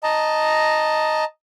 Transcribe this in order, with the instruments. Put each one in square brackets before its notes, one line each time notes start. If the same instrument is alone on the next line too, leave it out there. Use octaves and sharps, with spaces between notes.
[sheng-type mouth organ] D#5 A5 A#5